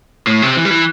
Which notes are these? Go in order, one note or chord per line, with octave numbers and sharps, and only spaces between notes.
A2
C3
E3
G3
E3